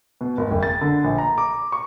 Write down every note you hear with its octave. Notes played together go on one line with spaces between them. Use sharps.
B2
G#1
F#1
A6
D3
A#1
A#5
D6
C#6